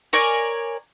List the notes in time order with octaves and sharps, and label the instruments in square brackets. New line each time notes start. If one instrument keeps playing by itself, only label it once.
[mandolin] A#4 C#5 D5 G#5